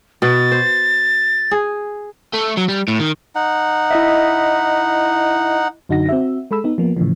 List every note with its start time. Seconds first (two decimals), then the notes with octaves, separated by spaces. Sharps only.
0.22 B2 A6
0.51 C5
1.51 G#4
2.34 A3
2.57 F#3
2.68 G3
2.88 A2
3.00 D#3
3.35 D#4 F#5
3.91 E4 D#5 E5
5.89 F#2 D3 D#4 F#4 F#5 A#6
6.09 C4 F#4 E5
6.51 G#3 A4 B5 E6
6.64 B3 D#4
6.78 F3 A#3 B3
6.97 A2 C#3 E3 F3